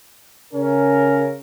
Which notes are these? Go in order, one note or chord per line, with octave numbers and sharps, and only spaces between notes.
C#3 C#4 A#4